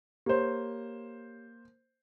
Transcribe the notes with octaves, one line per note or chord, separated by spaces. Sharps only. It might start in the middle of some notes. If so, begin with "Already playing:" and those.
A#3 G4 C5 C#5